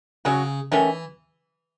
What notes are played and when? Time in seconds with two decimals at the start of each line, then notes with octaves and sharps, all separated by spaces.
0.25 C#3 F#3 C#4 F#4
0.72 D#3 E3 A3 C#4